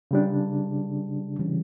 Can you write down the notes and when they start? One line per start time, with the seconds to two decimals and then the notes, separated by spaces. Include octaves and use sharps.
0.11 C#3 G3 D4
1.39 C#3 E3 G3 C#4